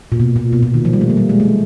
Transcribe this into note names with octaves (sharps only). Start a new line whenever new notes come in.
A#2
B2
A#2
B2
A#2
D#3
F3
G3
A3
A#3
G3
G#3
A3